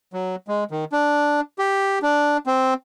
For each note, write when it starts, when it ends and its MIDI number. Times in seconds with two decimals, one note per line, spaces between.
0.13 0.36 54
0.48 0.64 56
0.71 0.85 51
0.92 1.41 62
1.59 1.99 67
2.02 2.37 62
2.47 2.74 60